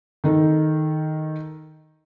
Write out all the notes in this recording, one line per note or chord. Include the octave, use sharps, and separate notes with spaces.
D#3 D#4 A4